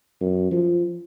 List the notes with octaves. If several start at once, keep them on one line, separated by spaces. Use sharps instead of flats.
F#2
F3